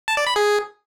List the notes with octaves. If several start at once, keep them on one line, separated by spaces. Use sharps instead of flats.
A5
D5
B5
G#4